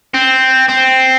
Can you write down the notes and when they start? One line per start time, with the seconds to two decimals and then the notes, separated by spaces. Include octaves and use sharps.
0.14 C4
0.69 C4